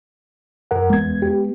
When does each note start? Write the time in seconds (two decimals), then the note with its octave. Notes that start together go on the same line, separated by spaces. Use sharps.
0.71 F#2 A#4 F#5
0.90 E2 G#3 A3 B3 G#6
1.22 G4